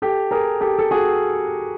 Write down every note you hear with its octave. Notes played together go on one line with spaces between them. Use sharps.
G4 A4
G#4 A#4
G4 A4
A4
F#4 G#4